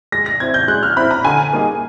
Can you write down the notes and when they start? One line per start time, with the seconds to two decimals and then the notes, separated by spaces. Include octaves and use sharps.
0.12 G#3 A#6
0.26 A#6
0.40 C4 E4 G#6
0.54 G6
0.68 G#3 F#6
0.83 F6
0.96 C4 E4 B5
1.11 A#5
1.25 D3 G#5
1.53 G3 A#3 D#4 G#4